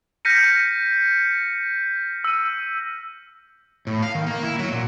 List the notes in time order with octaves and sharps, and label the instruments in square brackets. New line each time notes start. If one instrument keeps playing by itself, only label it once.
[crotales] F6 G6 A#6 B6 C#7 D#7
E6 D#7
[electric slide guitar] A2
F5
D#3
A#3
E4
F#3
A#2